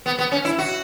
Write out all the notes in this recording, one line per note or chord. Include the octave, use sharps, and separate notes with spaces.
B3
B3
C#4
E4
F#4